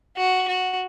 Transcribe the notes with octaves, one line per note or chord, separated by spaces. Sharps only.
F#4
F#4